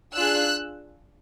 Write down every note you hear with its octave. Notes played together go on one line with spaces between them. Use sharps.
D4 F4 G#4 E6 F#6